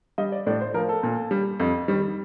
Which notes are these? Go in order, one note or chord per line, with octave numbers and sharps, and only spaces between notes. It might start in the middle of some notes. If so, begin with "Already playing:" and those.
G3 D#5
D5
A2 D5
C5
F3 A#4
A4
A#2
G3
F2
D#3 G3